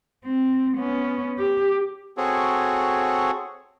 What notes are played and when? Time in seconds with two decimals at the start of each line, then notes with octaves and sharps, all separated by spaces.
0.25 C4
0.77 B3 C#4
1.38 G4
2.17 C4 F#4 G#4 A4 C#5